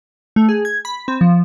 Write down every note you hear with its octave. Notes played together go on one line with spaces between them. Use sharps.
A3
G#4
G#6
B5
C4
F3